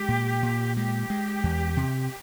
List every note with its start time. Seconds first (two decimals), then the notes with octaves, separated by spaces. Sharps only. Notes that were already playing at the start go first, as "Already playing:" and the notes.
Already playing: G#3 G4
0.08 A#2
0.43 A#2
0.76 G#3 G4
1.10 G#3
1.44 E2
1.77 C3